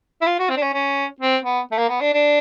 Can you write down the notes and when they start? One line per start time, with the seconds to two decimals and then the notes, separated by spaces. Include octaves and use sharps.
0.21 E4
0.26 F4
0.39 F#4
0.50 C4
0.57 D4
0.62 C#4
0.73 C#4
1.20 C4
1.44 B3
1.72 A3
1.78 A#3
1.89 B3
2.01 D4
2.13 D4